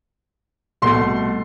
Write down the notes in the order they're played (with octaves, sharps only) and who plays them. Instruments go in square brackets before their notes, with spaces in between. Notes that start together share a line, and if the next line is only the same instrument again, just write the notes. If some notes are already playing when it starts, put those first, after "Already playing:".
[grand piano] C2 B2 A3 C6